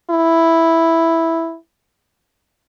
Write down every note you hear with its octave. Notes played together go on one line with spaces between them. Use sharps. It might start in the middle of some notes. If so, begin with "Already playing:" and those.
E4